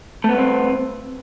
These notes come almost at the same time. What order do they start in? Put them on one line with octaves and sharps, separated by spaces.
A3 B3 G2 C4